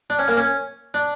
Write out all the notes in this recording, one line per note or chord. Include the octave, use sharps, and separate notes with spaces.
D4
C#4
A#3
C#4
D4